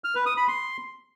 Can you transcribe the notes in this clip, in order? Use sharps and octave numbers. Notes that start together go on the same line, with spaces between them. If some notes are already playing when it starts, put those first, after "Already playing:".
F6
B4
D#6
B5
C6